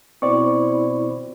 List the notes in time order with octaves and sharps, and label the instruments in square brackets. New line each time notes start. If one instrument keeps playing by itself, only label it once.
[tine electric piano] B2 C4 [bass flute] E4 [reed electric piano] C5 D5 C#6